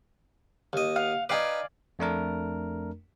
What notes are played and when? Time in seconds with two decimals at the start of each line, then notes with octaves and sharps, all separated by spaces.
0.73 D#2 D#5
0.96 F5 F#5
1.29 D#4 B4 D5 F5 G#5
1.99 F2 A3 D4 A#4